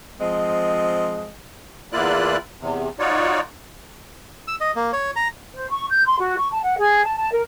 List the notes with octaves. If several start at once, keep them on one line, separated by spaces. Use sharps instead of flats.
F3 G#3 C4 D#5
E2 A#3 E4 F4 D5 F#6
E2 C3
D#4 F4 F#4 C#5 D5
E6
D#5
A#3
C#5
A#5
C5
C#6
G6
C6
F#4
C#6
A5
F#5
G#4
A5
A5
A#4